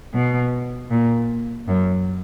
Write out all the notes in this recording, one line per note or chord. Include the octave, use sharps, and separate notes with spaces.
B2
A#2
F#2